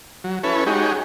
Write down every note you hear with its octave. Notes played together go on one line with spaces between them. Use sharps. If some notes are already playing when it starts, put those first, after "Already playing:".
F#3
C#4 E4 A4 B4 C#5
G#3 D#4 F#4 G4 C#5